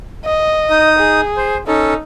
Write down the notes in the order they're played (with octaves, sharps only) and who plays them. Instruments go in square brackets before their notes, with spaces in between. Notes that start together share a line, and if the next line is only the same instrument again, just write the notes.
[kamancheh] D#5
[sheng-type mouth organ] D#4 D#6
[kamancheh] G#4
[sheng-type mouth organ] C5
[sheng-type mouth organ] C#4 A4 [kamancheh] D#4